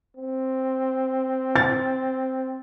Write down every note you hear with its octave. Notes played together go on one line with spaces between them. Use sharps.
C4
A6